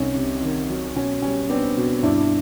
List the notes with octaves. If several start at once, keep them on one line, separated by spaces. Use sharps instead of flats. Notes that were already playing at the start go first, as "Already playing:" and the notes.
Already playing: C2 C#4 D#4
C3
D#3
F#3
B2 C#4
G3 C#4
B3 C4 D4
B2
G2 D4 E4